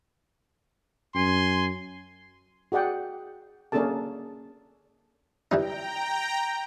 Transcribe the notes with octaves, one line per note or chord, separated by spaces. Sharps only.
F#2 G#5 C6
F#4 G#4 D5 F#5 G5
A#3 C#4 D4 G#4 A4 A5
E3 G3 D#4 G5 A#5